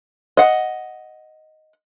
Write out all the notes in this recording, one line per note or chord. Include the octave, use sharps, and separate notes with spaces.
D#5 F#5